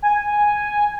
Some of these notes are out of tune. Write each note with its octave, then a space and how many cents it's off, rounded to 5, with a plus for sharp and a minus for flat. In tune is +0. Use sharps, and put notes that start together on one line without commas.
G#5 -5